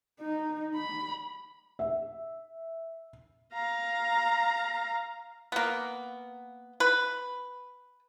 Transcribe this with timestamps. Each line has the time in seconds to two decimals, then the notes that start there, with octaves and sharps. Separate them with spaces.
0.20 D#4
0.75 B5
1.79 E5
3.53 F5 A#5
5.52 A#3 B3
6.80 B4